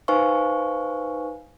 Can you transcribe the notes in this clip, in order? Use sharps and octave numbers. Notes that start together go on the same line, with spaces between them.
D#4 B4 C5 F5 G#5 C#6